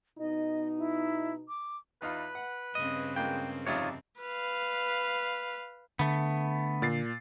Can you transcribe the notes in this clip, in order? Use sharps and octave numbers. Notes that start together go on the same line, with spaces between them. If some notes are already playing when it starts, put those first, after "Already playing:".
B2 B3 D#4 D#5
E4
D6
E2 D#4 F4 B4
F#5
G2 C#3 C4 D#5
G#3 A#3 F4 G5
F2 C3 D#4 F4 C#5 D5
B4 F5
D3 A3 B3
A#2 A6 C7